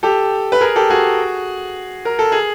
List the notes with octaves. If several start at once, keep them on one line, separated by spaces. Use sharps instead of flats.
G4 A4
B4
G#4 A#4
G4 A4
F#4 G#4
A#4
A4
G#4